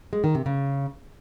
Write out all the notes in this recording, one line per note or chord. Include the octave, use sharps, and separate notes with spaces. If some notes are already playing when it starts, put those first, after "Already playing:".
G#3
D#3
C3
C#3